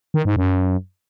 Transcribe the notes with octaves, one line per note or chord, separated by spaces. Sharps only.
D#3
G#2
F#2